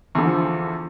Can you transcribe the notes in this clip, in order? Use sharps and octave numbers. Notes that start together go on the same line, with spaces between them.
E2 D3 E3 F3